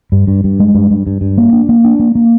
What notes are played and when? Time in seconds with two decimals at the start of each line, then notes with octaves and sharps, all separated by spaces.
0.12 G2
0.27 G2
0.44 G2
0.60 G#3
0.75 G2
0.91 G2
1.07 G2
1.21 G2
1.38 A#3
1.53 D4
1.69 A#3
1.84 D4
2.00 A#3
2.15 A#3